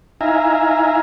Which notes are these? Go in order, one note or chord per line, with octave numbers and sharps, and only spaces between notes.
D#4 E4 E5 F5 G#5 A#5